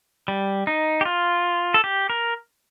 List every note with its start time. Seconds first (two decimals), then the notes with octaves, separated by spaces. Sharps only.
0.28 G3
0.67 D#4
1.01 G4
1.05 F4
1.74 A4
1.84 G4
2.10 A#4